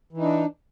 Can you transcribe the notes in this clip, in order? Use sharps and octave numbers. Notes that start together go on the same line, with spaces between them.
E3 D4 D#4